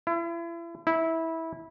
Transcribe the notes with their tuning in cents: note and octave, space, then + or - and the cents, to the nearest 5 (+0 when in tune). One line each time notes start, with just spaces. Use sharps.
E4 +40
E4 -15